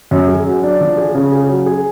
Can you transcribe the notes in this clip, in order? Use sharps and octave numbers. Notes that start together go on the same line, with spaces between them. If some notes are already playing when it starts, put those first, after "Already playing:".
F#2
G#4
F#3
D4
F3
G#4
C#3
G#4
F#3
G#4